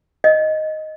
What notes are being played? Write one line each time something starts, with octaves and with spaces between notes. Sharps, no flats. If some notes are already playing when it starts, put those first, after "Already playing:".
D#5